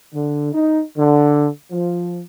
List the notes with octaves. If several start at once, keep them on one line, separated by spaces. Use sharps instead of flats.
D3
D#4
D3
F3